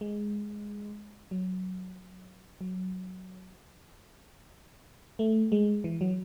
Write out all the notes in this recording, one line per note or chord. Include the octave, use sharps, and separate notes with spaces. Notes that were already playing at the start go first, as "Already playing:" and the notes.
G#3
F#3
F#3
A3
G#3
E3
F#3